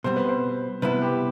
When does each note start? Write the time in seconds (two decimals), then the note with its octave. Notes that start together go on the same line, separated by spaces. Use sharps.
0.04 B2 G3 C4 C5
0.16 B4
0.29 C5
0.82 C3 G3 B3 E4 B4
1.02 G4